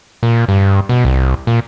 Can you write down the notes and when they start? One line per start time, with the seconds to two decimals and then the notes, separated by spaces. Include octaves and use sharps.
0.23 A#2
0.48 G2
0.89 B2
1.05 C2
1.47 A#2